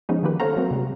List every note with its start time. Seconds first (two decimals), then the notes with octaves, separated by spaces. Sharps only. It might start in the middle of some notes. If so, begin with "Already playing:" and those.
0.09 C#3 F3 G#3 B3 C#4 D#4
0.23 D#3 F3 A#3 G4 B4
0.40 A4 C5 C#5 F5 F#5 A#5
0.56 F#3 A3 A#3 C4 F#4
0.71 C3 G3 G#3